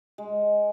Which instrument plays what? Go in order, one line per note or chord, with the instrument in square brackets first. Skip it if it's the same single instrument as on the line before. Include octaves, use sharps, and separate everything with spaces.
[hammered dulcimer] G#3